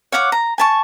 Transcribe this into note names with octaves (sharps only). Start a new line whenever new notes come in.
C#5 F5 F#5 D6
A#5
G#5 A5 C#6